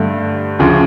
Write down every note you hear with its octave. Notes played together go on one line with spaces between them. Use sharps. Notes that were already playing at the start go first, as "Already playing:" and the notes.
Already playing: G2 D3 A3
D2 C#3 F3